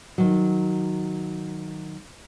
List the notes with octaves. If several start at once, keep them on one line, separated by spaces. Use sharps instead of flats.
D#3 F#3